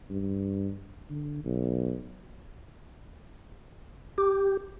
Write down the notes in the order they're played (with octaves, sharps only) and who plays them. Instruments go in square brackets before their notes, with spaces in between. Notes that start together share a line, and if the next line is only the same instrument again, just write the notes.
[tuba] G2
D3
B1
[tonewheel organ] G4